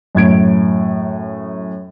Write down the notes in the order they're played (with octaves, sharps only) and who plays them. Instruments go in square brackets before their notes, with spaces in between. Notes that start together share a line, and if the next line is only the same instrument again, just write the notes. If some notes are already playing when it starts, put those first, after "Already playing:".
[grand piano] F#2 A2 G#6 D7